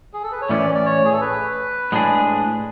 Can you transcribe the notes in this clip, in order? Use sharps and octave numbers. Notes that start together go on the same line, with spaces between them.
G#4
A4
B4
C#5
A2 E3 A3 C#4 D5
D5
C#5
G#4
A4
B4
A2 G#3 D4 G#4